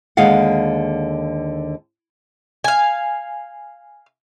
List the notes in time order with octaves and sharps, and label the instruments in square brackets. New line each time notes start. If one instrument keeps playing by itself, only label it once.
[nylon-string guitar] D#2 D3 G#3 F5 F#5
[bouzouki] F5 G#5